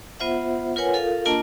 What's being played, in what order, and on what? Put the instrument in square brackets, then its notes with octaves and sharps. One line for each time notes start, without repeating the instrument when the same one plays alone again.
[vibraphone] B3 F4 C5 E5 F#5
F4 A#4 B4 C#5 F#5 G#5
F4 A4 A#4 F5
A#3 D4 F4 A#4 D#5 A5